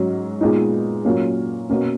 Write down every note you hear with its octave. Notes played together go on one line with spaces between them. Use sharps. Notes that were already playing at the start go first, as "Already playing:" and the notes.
Already playing: G#2 F#3 C#4
A#2 G#3 B3 D#4
A#2 F#3 A#3 C#4
B2 A#3 C#4